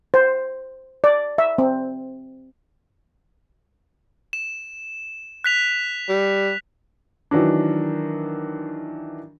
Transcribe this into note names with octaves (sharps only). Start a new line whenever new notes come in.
C5
D5
E5
C4
E7
F#6 B6 F7
G3
D#3 E3 F#3 D4